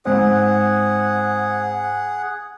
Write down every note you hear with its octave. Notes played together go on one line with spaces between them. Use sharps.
G#2 C4 G#4 F#5